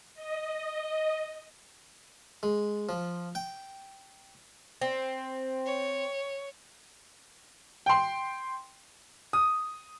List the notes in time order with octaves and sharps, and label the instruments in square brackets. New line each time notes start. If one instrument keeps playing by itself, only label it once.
[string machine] D#5
[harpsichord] G#3
F3
G5
[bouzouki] C4
[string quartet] C#5
[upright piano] G5 C6
[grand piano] D#6